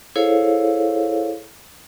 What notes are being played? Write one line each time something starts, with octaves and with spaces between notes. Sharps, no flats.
E4 G#4 A4 C5 C#5 F5